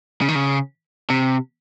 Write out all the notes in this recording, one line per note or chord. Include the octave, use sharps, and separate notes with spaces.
C#3
D#3
C#3
C3